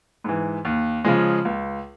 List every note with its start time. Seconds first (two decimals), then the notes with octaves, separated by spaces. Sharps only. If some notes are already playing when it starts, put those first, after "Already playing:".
0.24 G#2 E3
0.65 D#2
1.05 C#3 F3 G#3
1.45 C#2